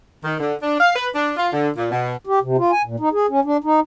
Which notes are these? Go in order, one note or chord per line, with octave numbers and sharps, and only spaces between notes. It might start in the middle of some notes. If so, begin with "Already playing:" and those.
D#3
D3
D4
F5
B4
D4
F4
D3
A#2
B2
G4
C3
F4
G#5
A#2
D#4
G#4
C#4
D4
D#4